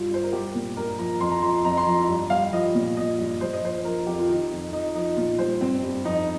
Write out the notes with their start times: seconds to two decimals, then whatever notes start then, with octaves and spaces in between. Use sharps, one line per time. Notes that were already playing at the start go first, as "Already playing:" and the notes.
Already playing: G2 G3 F4
0.11 G2 C5
0.23 A#4
0.33 G3 G4
0.55 A#2
0.76 G2 A#4
0.99 F3 A#5
1.20 F2 C6
1.31 A#5
1.42 F3 C6
1.65 F2 A#5
1.77 C6
1.86 F3 A#5
2.08 G2
2.30 G3 F5
2.52 F3 D#5
2.75 A#2
2.97 F3 D#5
3.18 G2
3.40 G2 C5
3.53 D#5
3.62 F3 C5
3.85 F3 A#4
4.07 F2 G4
4.19 F4
4.29 D#3 D#4
4.51 F2
4.72 F3 D#4
4.95 F3 D#4
5.16 A#2 F4
5.39 G3 C5
5.61 G2 C4
5.83 G2
6.05 F2 D#4